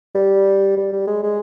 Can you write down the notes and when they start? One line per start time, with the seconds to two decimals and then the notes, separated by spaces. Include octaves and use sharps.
0.15 G3
0.77 G3
0.93 G3
1.07 G#3
1.23 G#3